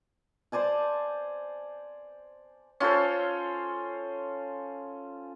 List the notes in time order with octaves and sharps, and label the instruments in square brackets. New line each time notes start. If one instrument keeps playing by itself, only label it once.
[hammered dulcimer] C5 D5 G#5 A5
C#4 F4 A4 C5